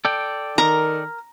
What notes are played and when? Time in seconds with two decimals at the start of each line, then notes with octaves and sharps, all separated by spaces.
0.05 A4 D5 G5
0.58 D#3 A#4 A#5